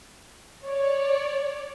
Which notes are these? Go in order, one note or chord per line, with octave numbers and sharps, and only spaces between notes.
C#5 D5